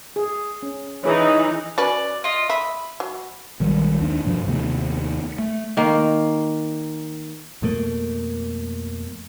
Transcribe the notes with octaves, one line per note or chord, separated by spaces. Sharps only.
G#4
C#4
E3 D#4 G#4 C#5
C#4 F#4 B4 D5
F4 D#5
E5 B5
F#3
B1 D#3 G3 G#3
D#2 D4
G2 B2 F3
D#2 C3 A3 B3
A3
D#3 A#3
F2 B2 A3 A#3